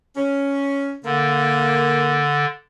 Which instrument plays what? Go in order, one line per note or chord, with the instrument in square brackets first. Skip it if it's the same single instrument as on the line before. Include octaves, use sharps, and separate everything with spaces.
[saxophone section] C#4
[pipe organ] D3 [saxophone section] A#3